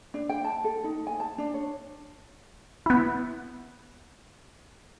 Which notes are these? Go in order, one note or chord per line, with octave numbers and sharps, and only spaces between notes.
D4
G5
A5
A4
D#4
G#5
A5
D4
C#5
B3 E4